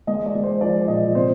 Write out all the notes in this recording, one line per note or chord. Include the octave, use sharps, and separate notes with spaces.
G#3 D#5
D5
G#3
C5
F3 D5
A#2 D#5
C3 C5